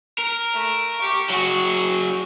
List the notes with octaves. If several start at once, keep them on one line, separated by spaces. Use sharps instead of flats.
A#4
A3
G4 C#6
F#3 F#4 G#4